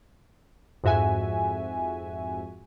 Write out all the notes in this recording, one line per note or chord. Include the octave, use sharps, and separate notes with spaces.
F2 G#2 F#4 E5 G#5